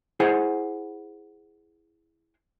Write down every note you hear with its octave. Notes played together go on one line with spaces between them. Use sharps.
E4 G#4 C5 F#5 G#5